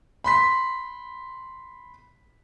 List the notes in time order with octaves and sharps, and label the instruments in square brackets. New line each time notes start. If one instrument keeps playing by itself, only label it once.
[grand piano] B5 C6 B6